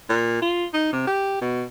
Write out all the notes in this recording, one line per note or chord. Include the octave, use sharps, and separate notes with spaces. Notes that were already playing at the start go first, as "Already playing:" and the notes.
A#2
F4
D#4
C3
G4
B2